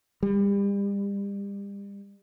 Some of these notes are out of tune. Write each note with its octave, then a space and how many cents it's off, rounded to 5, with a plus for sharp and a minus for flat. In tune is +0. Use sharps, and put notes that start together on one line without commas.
G3 +35